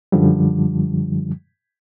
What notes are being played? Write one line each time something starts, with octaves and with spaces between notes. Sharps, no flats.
F#2 D3 F3 G3